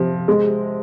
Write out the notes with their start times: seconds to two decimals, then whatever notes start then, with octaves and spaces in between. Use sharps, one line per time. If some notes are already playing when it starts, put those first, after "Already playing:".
Already playing: C3 F3
0.28 G#3